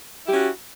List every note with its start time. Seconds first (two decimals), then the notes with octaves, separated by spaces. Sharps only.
0.24 E4
0.28 G4
0.32 C#4
0.35 F#4